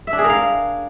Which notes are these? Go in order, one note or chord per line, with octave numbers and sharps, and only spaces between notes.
E5
D4
G#4
A#4
F5